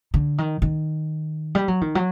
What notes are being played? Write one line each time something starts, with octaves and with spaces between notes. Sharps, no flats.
D3
D#3
D#3
G3
F#3
D#3
F#3